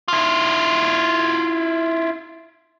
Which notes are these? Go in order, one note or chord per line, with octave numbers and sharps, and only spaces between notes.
E4 F4